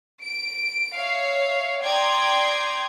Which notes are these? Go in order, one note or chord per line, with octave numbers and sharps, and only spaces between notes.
D7
C#5 E5 F5
D5 G5 A#5 C6 D#6 G#6